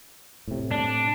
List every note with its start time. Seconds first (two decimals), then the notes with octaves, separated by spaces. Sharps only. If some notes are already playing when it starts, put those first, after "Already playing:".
0.47 A2 C3
0.71 D4